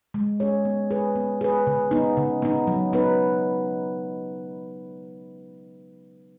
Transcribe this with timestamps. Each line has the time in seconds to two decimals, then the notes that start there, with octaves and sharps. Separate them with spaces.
0.14 G#3
0.40 C#4 G#4 C#5
0.65 B3
0.91 G#4 B4
1.16 B3
1.41 G#4 B4
1.67 C#3
1.91 B3 D#4
2.17 C#3
2.42 B3 D#4
2.67 F#3
2.93 B3 D#4 B4